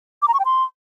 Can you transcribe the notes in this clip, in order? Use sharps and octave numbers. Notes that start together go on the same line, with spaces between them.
D6
A#5
C#6
G5
C6